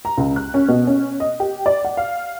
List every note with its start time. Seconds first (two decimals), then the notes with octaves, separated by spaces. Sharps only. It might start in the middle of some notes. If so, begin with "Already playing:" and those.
0.05 A#5
0.17 C#2
0.36 F#6
0.54 C#4
0.68 B2
0.87 C#4
1.20 D#5
1.40 G4
1.66 D5
1.85 F#5
1.97 F5